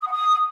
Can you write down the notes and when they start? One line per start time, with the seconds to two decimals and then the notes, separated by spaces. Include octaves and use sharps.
0.01 D#6
0.06 F#5
0.12 D#6